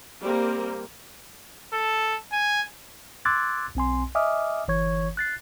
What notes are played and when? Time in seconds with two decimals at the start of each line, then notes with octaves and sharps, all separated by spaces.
0.22 G3 A#3 C4 G4 A#4
1.73 A4
2.32 G#5
3.25 C6 D6 E6 F#6 G#6 A6
3.75 B1 C4 G#5 C6
4.15 D#5 E5 G#5 D6 D#6 F6
4.68 G1 E3 C#5 C#6 G#6
5.17 F#6 A6 C7